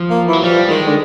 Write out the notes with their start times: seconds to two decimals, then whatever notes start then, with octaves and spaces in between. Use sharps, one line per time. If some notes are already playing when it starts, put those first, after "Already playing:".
Already playing: F3
0.10 A#3
0.27 E3
0.33 F#3
0.43 F3 G3
0.69 D#3 G#3
0.87 D3